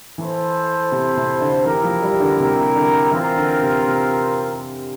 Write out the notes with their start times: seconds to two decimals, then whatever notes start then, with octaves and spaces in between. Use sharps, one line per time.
0.18 E3 E4 A4 C5
0.92 C3
1.17 C3
1.41 D3
1.65 E3 E4 G4 A#4
1.84 F3
2.02 G3
2.20 D3
2.40 C3
2.76 D3
3.12 E3 C4 F4 A#4
3.37 D3
3.62 C3
3.87 C3